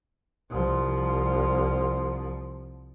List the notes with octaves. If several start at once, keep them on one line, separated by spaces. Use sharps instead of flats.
C2 F3